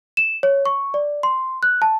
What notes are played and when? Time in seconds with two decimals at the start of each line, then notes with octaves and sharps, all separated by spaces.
0.17 E7
0.43 C#5
0.66 C#6
0.94 D5
1.23 C6
1.63 F#6
1.82 A5